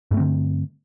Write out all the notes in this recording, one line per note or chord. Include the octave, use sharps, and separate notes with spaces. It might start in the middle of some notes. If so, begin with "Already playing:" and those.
G2 D3 A3 C4